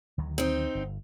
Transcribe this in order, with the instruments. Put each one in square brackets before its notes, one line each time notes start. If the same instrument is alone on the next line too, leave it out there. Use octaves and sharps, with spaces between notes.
[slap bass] D2 D#3 F#3
[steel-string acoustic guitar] C4 D#4
[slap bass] G1